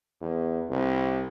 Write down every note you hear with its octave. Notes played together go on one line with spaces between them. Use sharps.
E2
C2